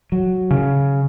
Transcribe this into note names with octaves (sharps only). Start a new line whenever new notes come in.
F#3
C#3